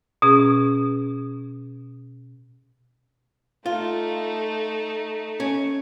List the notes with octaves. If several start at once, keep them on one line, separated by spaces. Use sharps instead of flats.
B2 C#4 G#4
A3 D#4 F4
C#4